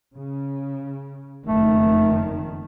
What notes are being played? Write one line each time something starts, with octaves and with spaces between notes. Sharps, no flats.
C#3
F#1 F2 D#3 A3